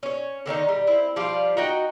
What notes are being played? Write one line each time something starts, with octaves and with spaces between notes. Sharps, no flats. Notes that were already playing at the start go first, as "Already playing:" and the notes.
C#4 C#5
D3 D#3 C#4 D#4
G3
C4 E4
F3 G3 F4 D5
D#4 F#4 D#5 G5